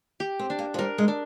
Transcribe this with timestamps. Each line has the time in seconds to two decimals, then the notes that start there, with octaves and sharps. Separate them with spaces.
0.20 G4
0.39 C4
0.50 D4
0.59 A#3
0.74 F3
0.78 G3 A#4
0.98 G#3
1.08 D4